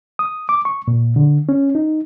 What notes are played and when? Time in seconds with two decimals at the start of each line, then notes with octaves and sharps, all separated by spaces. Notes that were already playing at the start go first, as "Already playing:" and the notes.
0.19 D#6
0.49 D6
0.65 C#6
0.88 A#2
1.16 D3
1.49 C#4
1.75 D#4